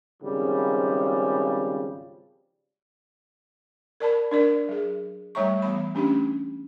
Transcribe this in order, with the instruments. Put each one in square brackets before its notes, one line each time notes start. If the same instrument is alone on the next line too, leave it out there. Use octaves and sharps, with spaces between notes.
[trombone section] G#1 C#3 F3 G3
[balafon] A#4 D5 A5 B5
D4 A#4 D5
F#3 G#4
G3 A3 C#5 E5 A#5 C#6
E3 G3 B3 B5
A3 C#4 D4 G4